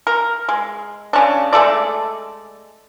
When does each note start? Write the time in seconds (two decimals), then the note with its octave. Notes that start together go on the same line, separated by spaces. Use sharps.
0.07 A#4
0.49 G#3
1.13 C#3 C#4 D4
1.53 G#3 A3 A4 D5